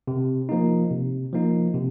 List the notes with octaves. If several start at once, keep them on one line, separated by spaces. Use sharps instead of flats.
C3
F3 A#3 D#4
C3
F3 A#3 D#4
C3